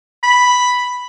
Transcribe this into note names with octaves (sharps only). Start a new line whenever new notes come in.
B5